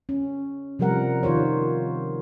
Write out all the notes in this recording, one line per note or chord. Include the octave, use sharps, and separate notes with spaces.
C#4
C3 F3 G3 A#4 F#5
D#3 F4 C5 C#5